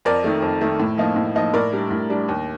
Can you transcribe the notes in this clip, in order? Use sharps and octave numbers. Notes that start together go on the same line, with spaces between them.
F2 A#4 D5
D#3 A3
F2
D#3 A3
A2
F3 A#3 D#4
A2
F3 A#3 D#4
A2 A#4 D5
G3 D4
A2
G3 D4
D#2